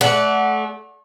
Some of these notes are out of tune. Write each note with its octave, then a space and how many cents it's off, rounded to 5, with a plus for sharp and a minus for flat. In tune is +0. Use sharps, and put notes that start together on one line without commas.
A3 -30 D5 -25 F#5 +0